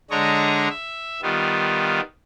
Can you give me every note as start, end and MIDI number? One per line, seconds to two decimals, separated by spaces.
0.11 0.68 50
0.11 0.68 56
0.11 0.68 62
0.11 0.68 73
0.11 0.68 75
0.11 0.68 82
0.70 1.21 76
1.22 2.00 51
1.22 2.00 55
1.22 2.00 59
1.22 2.00 65